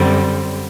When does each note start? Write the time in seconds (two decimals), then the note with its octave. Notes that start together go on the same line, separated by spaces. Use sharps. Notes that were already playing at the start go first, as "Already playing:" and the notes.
Already playing: F#2 D3 G3 C4